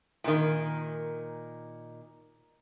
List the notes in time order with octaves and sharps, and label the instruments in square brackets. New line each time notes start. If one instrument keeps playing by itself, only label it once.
[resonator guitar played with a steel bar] A#2 D#3